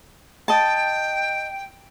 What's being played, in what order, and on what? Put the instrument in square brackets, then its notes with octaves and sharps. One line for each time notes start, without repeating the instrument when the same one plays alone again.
[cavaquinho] D#5 A5 [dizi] G5